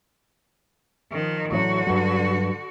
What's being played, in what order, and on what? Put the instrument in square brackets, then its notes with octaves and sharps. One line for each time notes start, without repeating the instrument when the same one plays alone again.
[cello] D#3 F3
[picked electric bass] A2 E3 F#3 [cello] D3 F#4
[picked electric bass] G2 F#3